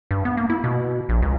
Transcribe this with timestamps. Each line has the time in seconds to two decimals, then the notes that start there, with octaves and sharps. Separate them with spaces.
0.11 G2
0.25 B3
0.37 A#3
0.50 E4
0.64 B2
1.09 A#1
1.22 C#2